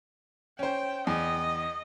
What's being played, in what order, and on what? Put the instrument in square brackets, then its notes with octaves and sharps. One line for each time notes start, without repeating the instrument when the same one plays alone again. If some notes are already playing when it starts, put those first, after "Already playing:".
[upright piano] C#4 C5 [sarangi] G5
[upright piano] E2 [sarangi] D#5